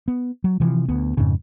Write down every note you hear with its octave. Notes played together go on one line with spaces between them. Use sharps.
B3
F#3
C3 E3 F3
D2 B3
F2 G#2 C#3